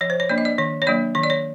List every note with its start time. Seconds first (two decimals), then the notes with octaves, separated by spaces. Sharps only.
0.01 F3 C#5
0.10 C5
0.20 C#5
0.29 A#3 D4 D5
0.38 D#5
0.45 D5
0.58 D#3 C#5
0.82 C#5
0.87 F#3 A#3 D4 D5
1.15 D#3 C#5
1.23 D5
1.30 C#5